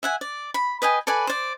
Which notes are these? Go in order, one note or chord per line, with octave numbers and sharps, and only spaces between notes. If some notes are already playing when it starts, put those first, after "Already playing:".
E5 F#5 G#5
D5
B5
B4 D#5 G5 G#5
A4 B4 D5 G#5
C5 D5